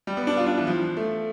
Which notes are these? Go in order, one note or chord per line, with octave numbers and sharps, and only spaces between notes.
G3
B3
D4
F4
D4
E3
F3
A3